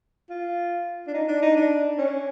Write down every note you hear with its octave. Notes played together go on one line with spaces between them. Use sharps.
F4
D4
D#4
D4
D#4
D4
C#4